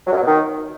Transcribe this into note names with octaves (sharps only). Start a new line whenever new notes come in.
F#3
F#2
F#3
B2
D#3